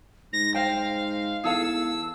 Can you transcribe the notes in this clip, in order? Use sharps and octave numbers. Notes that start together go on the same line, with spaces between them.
G#2 A#6
C5 F5 G5
E2 G#4 A4 F5 E6